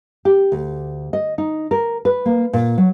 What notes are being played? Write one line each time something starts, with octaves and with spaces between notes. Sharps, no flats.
G4
D2
D#5
D#4
A#4
B4
A#3
A#2
F#3